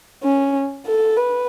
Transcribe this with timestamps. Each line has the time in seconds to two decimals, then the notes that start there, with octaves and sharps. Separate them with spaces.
0.23 C#4
0.87 A4
1.17 B4